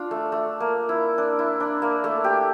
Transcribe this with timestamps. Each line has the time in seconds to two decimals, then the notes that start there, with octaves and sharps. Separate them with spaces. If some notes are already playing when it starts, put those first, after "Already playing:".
Already playing: D4 F4
0.11 A3
0.32 A3
0.60 A#3
0.89 E4
1.18 D4
1.39 E4
1.60 D4
1.82 A#3
2.04 A3
2.24 G4